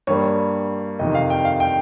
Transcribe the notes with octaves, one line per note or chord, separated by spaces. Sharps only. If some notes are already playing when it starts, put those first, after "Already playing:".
G2 G3 A#3 C#5
F2 C3 D#3 D#5
F5
G5
F5
G5